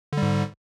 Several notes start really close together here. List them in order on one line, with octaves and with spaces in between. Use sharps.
D3 G3 G#2